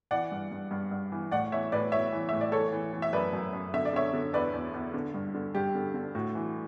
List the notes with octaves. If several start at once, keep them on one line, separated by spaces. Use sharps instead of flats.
E3 D5 F#5
G2
G2
G2
G2
E3
A2 D5 F#5
E3 C#5 E5
A2 B4 D5
A2 C#5 E5
E3
A2 E5
D5
E3 A4 C#5
E3
E3
E5
F#2 B4 D5
F#2
F#2
D3 E5
D5
D3 C#5 E5
D3
E2 B4 D5
E2
E2
D3
G2
D3
G2 G4
D3
D3
A2 F#4
E3